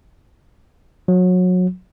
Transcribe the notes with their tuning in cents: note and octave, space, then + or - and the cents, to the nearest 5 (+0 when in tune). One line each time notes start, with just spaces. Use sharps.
F#3 -25